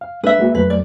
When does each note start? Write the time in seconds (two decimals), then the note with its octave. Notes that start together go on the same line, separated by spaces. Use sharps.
0.01 F5
0.24 G#3 D4 B4 E5
0.39 G#3 A#3 F#4
0.55 F2 F#3 A3 B4
0.70 D5